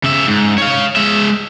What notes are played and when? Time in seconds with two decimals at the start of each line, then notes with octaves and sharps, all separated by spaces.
0.04 C#3 E5
0.27 G#2
0.58 C#5 F5
0.96 G#3 E5